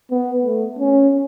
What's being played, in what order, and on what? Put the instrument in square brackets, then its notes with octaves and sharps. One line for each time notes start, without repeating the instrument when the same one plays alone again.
[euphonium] B3
A3
C#4